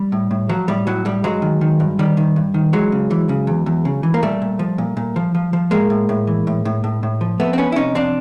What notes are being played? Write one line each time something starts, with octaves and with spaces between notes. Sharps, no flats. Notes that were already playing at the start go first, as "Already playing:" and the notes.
Already playing: G3
A2
A2
F3 F#3
A2 G3
A2 F#3
A2 G3
G2 F#3 G#3
D#3
D#3
G2
D#3 G3
D#3
G2
D#3
E3 F#3 G#3
C#3
E3
C#3
E2
E2
C#3
E3
A#3
A#2 G3 A3
A#2
F3
A#2
A#2
F3
F3
F3
A2 G#3 A#3
A2
A2
E3
A2
A2
A2
A2
F3
F2 A3 B3
C4
F2 B3 C#4
E4
C3 C#4 D#4
F2 C4 D4